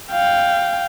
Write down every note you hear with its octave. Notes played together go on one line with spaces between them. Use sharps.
F5 G5